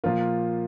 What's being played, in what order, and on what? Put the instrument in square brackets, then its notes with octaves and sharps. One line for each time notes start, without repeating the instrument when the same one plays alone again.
[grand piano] A#2 F3 A#3 F4